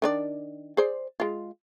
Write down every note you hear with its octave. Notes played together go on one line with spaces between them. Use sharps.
D#3 D4 D5
G#4 C5 D5
G#3 F4